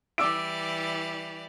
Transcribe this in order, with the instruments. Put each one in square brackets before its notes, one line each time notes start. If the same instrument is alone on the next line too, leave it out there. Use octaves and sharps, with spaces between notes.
[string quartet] E3 G3 D5 [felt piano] D6 E6 D7